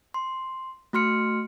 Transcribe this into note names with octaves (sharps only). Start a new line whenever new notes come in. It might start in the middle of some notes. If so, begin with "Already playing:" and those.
C6
A3 F#4 C6 F6 C#7